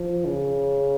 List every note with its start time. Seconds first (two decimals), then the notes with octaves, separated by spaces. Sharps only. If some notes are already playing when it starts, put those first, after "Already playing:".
Already playing: F3
0.26 C#3